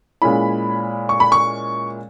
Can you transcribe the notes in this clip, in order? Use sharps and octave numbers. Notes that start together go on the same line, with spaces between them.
A#2 G#3 C#4 E4 B5
C#6
B5
C#6